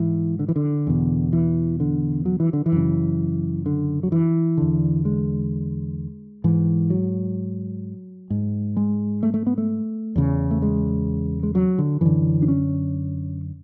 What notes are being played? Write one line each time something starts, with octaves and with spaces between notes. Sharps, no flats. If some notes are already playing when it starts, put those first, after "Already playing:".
Already playing: G#2 E3
D3
E3
D3
E2 B2
E3
D3
F#3
E3
D3
E3
F#2 C#3
D3
F#3
E3
E2 D3
G#3
G#2 E3
F#3
G#2
G#3
A3
A3
B3
A3
E2 C#3
A3
G#3
G#3
F#3
D3
F#2 D3 E3
D4
C#4